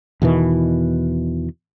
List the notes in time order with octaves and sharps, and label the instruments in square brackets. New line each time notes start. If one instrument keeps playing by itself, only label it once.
[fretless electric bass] E2 B2 D#3 E3